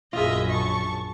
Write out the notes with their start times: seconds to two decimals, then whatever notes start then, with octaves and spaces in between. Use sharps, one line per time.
0.13 A#1 F#2 F4 G#4 D#5 E5
0.49 A5 C#6